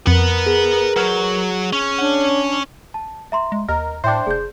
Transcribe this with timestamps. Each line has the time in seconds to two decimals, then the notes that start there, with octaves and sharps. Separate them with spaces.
0.07 F2 A#4 B4 F#5
0.46 G#4
0.96 F#3 B4 F6 G6
1.73 C#4
1.98 D4 C#5 F#5
2.94 A5
3.32 E5 A#5 C6
3.52 G#3
3.69 D#2 A#4 D#5
4.04 A2 D4 C5 E5 G5
4.27 F1 G#4 G6